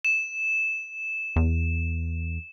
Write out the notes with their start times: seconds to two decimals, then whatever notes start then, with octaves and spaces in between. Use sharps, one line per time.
0.05 E7
1.36 E2